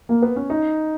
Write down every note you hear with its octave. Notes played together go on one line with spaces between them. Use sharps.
A#3
B3
C#4
D#4